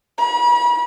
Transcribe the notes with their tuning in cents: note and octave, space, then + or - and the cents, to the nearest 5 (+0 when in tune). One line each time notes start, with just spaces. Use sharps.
B5 -40